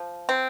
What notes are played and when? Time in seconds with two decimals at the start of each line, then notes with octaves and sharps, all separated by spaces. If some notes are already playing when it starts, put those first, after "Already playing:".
Already playing: F3
0.29 C4